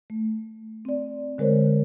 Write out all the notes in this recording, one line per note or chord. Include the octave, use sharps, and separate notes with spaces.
A3
C4 D5
D3 G#3 A#4 C5 C#5